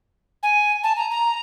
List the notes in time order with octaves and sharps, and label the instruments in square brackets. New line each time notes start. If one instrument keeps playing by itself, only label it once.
[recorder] G#5
A5
A#5
A#5